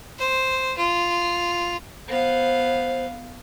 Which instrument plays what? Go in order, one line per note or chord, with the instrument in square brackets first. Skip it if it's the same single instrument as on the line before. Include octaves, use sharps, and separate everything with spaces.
[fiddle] C5
F4
[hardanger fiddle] B3 F5 [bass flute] C5